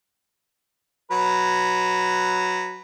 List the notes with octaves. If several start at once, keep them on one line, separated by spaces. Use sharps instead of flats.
F#3 B4